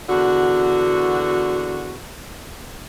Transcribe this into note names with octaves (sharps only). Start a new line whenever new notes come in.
E2 D3 F#4